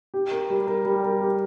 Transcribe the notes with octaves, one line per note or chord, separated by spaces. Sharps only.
G4
A#4
G3
A#4
G3
A#4
G4